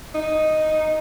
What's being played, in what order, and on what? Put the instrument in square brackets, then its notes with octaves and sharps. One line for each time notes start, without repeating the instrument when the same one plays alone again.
[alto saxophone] D#4